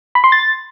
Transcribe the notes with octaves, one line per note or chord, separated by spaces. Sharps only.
B5
C6
A6